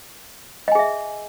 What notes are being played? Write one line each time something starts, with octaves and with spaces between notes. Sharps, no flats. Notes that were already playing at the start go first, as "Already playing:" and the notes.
G#4 D#5 E5 G#5